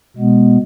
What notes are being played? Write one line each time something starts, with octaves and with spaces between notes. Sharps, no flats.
B2 G#3 B3